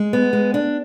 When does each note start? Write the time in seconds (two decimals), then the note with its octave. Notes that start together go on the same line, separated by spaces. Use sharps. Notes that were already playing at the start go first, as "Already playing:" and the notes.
Already playing: G#3
0.13 B3
0.33 G#3
0.54 D4